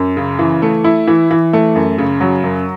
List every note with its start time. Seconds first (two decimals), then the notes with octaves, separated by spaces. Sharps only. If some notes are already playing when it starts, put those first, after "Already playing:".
Already playing: F#2
0.17 C#3
0.39 E3
0.62 A3
0.84 E4
1.08 E3
1.31 E3
1.53 A3
1.76 F#2
1.98 C#3
2.21 F#3
2.44 F#2